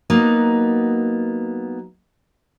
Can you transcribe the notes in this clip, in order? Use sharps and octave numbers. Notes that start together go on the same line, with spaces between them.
F#3 A#3 B3 D#4